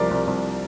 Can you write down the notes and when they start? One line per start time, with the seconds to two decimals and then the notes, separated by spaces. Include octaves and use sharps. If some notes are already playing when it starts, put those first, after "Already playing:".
Already playing: C2 F3 A#4 D5
0.11 C2
0.27 C2